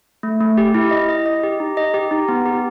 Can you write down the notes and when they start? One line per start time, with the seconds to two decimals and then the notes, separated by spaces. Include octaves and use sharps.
0.23 A3
0.41 A3
0.57 G4
0.74 E4
0.91 D#5
1.09 D#5
1.26 D#5
1.43 G4
1.60 D#4
1.77 D#5
1.94 G4
2.11 D#4
2.28 B3
2.46 G4